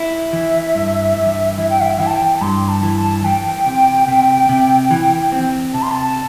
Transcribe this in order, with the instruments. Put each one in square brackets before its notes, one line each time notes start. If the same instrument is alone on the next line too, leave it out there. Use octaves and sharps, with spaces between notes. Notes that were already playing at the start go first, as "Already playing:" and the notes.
Already playing: [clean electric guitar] E4 [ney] E5
[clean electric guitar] E3
G2
G2
[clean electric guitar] E3 [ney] E5
[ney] G5
E5
[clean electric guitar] E3 [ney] G5
[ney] A5
G5
A5
[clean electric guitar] G2 [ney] C6
[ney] A5
[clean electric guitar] E3
[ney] A5
[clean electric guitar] E3 [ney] G5
[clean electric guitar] C3
C3
C3
E3
C4
[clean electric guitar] C3 [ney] A5
[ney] C6
A5